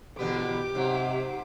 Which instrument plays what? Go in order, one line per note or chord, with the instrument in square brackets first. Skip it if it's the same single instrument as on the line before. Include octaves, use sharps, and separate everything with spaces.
[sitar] E2 D3 B3 [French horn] B2 [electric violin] G4 D6
[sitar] G#2 F#3 [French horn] C3